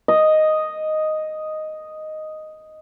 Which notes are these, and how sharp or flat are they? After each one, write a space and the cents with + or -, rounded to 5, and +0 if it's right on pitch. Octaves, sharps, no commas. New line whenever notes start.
D#5 +0